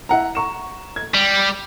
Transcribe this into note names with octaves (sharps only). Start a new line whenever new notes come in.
E4 F#5 A#5
A#5 C#6 E7
G#6
G3